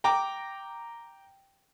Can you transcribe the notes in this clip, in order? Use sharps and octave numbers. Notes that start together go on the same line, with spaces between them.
G5 A#5 D6